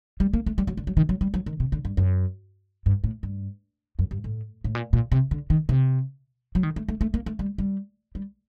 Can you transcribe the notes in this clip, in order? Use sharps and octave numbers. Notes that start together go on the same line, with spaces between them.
G3
A#3
A3
G3
F#3
D3
F#3
D#3
F#3
G3
F#3
D#3
C3
D3
G2
F#2
G2
A2
G2
F#2
G2
A2
A2
A#2
A#2
C3
D3
D#3
C3
F#3
D#3
A3
A3
A3
A#3
A3
G3
G3
G3